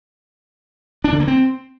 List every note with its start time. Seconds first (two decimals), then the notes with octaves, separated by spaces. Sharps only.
1.04 D4
1.12 D3
1.20 A#3
1.28 C4